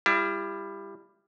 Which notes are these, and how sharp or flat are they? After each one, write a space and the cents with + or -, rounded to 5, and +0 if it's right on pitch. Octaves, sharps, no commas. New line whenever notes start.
G3 +20 E4 +35